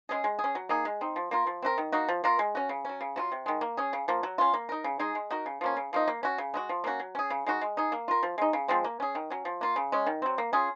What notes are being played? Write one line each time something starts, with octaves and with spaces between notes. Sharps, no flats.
G#3 C#4 G#4
G#3
G#4
C#4
F#3
A#3 D#4 G#4
G#3
C4 D#4
F3
A#3 F4 A#4
F3
C4 F#4 A#4
D#3
A#3 D#4 F#4
F3
A#3 F4 A#4
G#3
C#4 F#4
C#3
F#3 C#4
C#3
F#3 C#4 F4
C3
D#3 G#3
A#3
C#4 G#4
C#3
F3 A#3
F#3
C#4 F4
A#3
D#4 A#4
C#3
G#3 D#4 G#4
G#3
D#4 F#4 A#4
C#3
F3 A#3 C#4
C#3
F3 A#3 D#4
A#3
C#4 F#4
C#3
G#3 D#4 F#4
F3
A#3 C#4 F#4
F#3
C#4 G#4
C#3
G#3 D#4 F#4
G#3
D#4 G#4
A#3
F4 A#4
F3
G#3 D#4
C#3
F3 G#3 C4
A#3
C#4 G#4
D#3
F#3 C#4
F3
A#3 F4
C#3
G#3 C#4
D#3
F#3 C4
A#3
C#4 F4 G#4